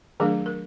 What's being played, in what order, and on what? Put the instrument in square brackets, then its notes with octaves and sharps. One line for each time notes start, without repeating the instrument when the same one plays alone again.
[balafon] D#3 F#3 A3 D4 G#4 A#4
A#4